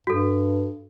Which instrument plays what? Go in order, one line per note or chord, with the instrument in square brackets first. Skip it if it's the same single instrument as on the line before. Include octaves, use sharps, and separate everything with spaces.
[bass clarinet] G2 [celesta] F#4 A4